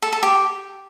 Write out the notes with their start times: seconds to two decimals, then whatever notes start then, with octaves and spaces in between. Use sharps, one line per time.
0.02 A4
0.13 A4
0.23 G4